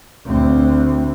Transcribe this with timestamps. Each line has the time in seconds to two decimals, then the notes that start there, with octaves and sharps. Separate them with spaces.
0.25 D2 C4